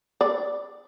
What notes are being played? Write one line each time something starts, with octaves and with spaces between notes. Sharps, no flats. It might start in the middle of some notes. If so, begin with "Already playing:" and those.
D5